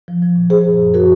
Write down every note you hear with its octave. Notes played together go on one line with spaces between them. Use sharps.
F3
F3
A#2
F3 G#4 C5
F#2
F#2
F3 F#4 A#4